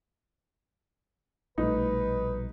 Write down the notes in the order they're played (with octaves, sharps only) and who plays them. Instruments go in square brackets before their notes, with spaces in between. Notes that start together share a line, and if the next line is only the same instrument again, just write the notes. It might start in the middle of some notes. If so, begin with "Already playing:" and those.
[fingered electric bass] A#1 B2 G3 [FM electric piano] A3 [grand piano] D#4 [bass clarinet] B4